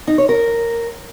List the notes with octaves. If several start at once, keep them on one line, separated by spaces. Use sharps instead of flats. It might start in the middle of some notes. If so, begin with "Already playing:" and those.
D#4
C#5
A#4